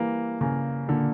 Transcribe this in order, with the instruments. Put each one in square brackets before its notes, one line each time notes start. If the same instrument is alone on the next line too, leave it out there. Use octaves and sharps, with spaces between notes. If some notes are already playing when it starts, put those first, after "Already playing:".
Already playing: [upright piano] E3 G3 [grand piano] A#3
[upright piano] C#3 [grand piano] A#3
[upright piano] A#2 [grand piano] D3